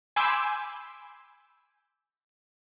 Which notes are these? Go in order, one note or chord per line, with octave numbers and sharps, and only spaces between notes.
G#5 B5 C6 D6 E6 G6